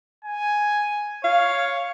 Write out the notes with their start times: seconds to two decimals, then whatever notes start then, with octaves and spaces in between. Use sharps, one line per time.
0.25 G#5
1.24 C#5 F5